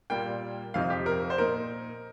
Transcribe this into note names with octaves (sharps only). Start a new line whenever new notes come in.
A#2 G3 A#3 F4 G5
F2 C3 F3 C4 D#4 F5
G4
A#4
C5
A#2 A#3 D#4 A#4